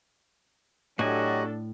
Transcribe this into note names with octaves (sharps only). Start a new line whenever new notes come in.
A2 F#3 D4 F#4 G4 A4 D#5 G#5